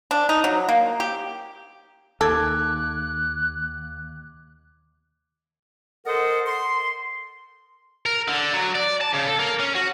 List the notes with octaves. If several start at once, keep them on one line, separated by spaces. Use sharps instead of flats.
D4
D#4
F#3
A#3
G4
D#2 A4 D6 F#6 G#6
A4 A#4 C5 D#5 F#5
C6
A#4
D3
F#3
D5
A5
C#3
A4
A#3
C#4
F#4